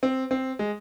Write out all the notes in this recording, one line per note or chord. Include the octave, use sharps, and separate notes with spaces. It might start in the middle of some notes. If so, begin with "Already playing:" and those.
C4
C4
G#3